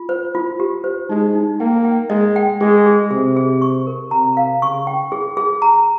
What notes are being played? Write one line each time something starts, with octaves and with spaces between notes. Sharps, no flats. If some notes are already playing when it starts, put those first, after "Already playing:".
Already playing: F4
C5
F4
G4
C5
G#3 D#4
D#4
A#3 G5
G5
G#3 D#5
G5
G#3 G#4
G#4
C3 G#4
G#4
C#6
A#4
C3 A#5
F5
C#3 C#6
G5
G#4
G#4
A#5